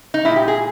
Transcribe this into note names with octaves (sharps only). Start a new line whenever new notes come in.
D#4
A#2 G#3 E4
G4
G#4